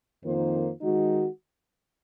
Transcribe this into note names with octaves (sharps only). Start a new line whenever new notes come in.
F2 D#3 A#3 F4 C5
D#3 G#3 D#4 F#4